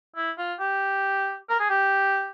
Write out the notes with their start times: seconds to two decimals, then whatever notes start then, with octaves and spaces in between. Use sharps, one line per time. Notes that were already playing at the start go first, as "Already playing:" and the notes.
0.16 E4
0.38 F4
0.59 G4
1.49 A#4
1.59 G#4
1.70 G4